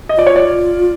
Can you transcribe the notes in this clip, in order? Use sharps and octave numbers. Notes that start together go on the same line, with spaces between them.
D#5
F4 D5
C#5
D5